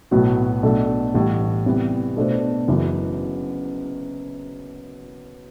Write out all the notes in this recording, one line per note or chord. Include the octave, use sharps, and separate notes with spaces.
B1 A2 F#3 B3 F#4
B1 B2 A3 D4 A4
A1 A2 G3
C3 E3 G3 B3
B2 A3 D4 A4 C5
F#1 F#2 E3